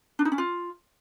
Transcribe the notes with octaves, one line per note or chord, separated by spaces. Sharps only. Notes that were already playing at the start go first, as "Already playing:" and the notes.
D4
D#4
C#4
F4